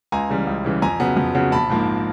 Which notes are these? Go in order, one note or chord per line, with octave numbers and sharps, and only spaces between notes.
C#2 G#5 A#5
C#3 E3 G3
C#2
C#3 E3 G3
F2 G#5 A#5
C#3 F#3 B3
F2
C#3 F#3 B3
A#1 A5 B5
G#2 F3 A#3